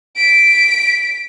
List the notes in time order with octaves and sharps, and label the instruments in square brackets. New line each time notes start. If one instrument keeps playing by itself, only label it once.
[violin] B6 D7